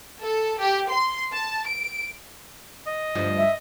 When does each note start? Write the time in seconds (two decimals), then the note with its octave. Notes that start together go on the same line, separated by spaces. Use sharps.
0.22 A4
0.59 G4
0.90 C6
1.32 A5
1.66 D7
2.86 D#5
3.15 D2 G2 F3
3.38 E5